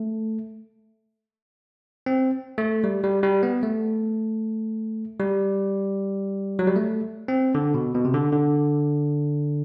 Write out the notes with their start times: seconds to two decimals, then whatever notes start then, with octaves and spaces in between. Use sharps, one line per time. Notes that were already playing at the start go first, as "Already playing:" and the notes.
Already playing: A3
2.06 C4
2.58 A3
2.84 G3
3.04 G3
3.23 G3
3.43 B3
3.63 A3
5.19 G3
6.59 F#3
6.67 G3
6.76 A3
7.28 C4
7.55 D3
7.74 B2
7.95 B2
8.05 C3
8.14 D3
8.33 D3